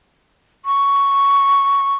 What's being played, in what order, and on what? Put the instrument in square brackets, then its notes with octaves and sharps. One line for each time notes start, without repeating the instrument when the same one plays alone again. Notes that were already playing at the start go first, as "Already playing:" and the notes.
[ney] C#6